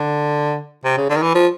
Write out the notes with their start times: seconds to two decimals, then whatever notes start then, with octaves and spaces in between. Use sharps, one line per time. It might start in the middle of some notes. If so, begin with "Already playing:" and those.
Already playing: D3
0.85 C3
0.97 C#3
1.10 D3
1.16 D#3
1.22 E3
1.35 F3